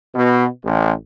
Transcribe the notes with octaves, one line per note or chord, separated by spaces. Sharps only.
B2
A1